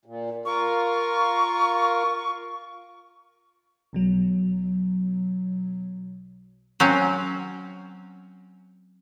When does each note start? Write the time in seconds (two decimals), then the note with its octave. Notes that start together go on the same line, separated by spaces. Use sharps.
0.05 A#2
0.45 F4 A#4 C#6
3.93 B1 B2 F#3
6.80 F#3 C4 C#4